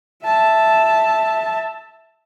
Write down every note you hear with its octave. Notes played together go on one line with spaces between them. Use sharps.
E5 A5